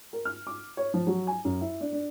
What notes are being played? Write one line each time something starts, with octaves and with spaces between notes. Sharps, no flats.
A#4
F6
D6
C#5
F3
F#3
G#5
F#2
E4
D4
D4